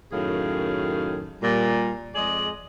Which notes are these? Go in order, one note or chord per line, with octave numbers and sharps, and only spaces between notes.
F#2 A2 D#3 G#4 F5
A#2 G3
F2 G#3 G#4 D5 D#5